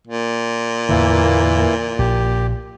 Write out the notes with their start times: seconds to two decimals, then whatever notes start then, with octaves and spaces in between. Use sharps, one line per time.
0.07 A#2
0.89 E2 A2 D3 E3 A#3 E4
1.99 A#1 G4